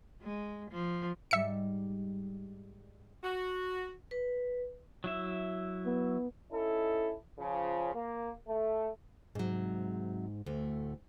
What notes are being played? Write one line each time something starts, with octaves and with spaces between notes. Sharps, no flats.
G#3
F3
G#2 G3 E5 C#7
F#4
B4
F#3 E4 E5
B3
C#4 D#4 E4 A4
C#3 F3
A#3
A3
G#2 C3 F#3
D2 A2 A3